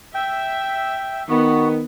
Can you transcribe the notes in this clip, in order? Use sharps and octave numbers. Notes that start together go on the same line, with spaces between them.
E5 G5
D#3 B3 F#4